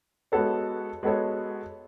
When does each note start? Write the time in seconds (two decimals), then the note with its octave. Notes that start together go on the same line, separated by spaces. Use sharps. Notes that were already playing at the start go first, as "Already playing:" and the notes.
0.32 G#3 B3 F#4 A4 C#5
1.03 G#3 B3 F#4 A4 C#5